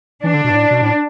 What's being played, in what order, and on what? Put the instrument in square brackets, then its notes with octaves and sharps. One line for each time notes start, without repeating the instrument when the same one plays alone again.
[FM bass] E3 [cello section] D4
[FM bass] D3
B2
G2
A2
B2
A2